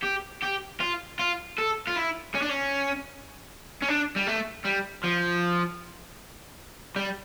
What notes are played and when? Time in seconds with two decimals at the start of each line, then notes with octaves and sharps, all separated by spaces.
0.03 G4
0.42 G4
0.80 F4
1.19 F4
1.58 A4
1.87 F4
1.96 E4
2.34 C#4
2.42 D4
2.49 C#4
3.82 C#4
3.88 D4
4.16 G3
4.27 A3
4.65 G3
5.04 F3
6.96 G3